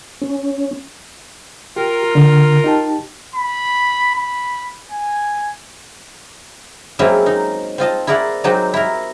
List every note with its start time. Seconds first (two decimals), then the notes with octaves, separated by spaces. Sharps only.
0.21 C#4
1.76 F4 G4 A#4
2.11 D3 F6
2.64 D#4 G4 A5
3.35 B5
4.15 B5
4.91 G#5
6.99 F#3 G#3 A#3 C4 C#4 E4
7.26 D#4
7.78 C4 F4 D#5 A5
8.07 E4 G#4 A#4 D5 F#5
8.44 F#3 G#3 C4 D#4 F#4 G4
8.74 E4 A#4